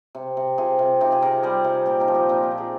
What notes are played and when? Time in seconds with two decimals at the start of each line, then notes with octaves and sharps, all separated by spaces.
0.15 C3
0.37 C3
0.58 C3 F4 G#4
0.79 C3
1.01 C3 D#4 G4
1.11 F4 G#4
1.22 C3 G4 A#4
1.43 G3 G#4 C5
1.64 C3
1.86 A#2 G4 A#4
2.00 D#4 G4
2.08 F3
2.15 D#4 G4
2.29 A#2 C4 D#4
2.43 G4 A#4
2.51 A#2
2.58 F4 G#4